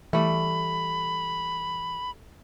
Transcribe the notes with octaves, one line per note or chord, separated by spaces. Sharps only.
E3 G3 A3 B5